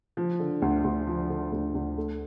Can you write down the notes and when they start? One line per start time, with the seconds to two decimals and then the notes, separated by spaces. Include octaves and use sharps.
0.17 F3
0.39 D3
0.62 D2
0.84 D2
1.07 F3
1.30 D3
1.53 D2
1.75 D2
1.98 A3